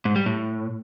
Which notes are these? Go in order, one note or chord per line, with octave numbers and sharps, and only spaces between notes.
G#2
G3
A2